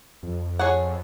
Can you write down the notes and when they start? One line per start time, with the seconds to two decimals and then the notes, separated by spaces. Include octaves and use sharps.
0.23 F2
0.59 G#4 C#5 F#5